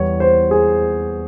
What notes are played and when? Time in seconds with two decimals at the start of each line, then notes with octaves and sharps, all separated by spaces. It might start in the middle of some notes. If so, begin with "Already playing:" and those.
Already playing: E2 E3 G3 C#5
0.20 C5
0.51 G#4